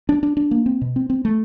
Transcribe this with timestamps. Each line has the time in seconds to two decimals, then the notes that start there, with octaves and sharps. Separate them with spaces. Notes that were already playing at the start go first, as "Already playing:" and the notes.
0.09 D4
0.23 D4
0.37 D4
0.51 A#3
0.66 C4
0.81 B2
0.96 C4
1.10 C4
1.25 A3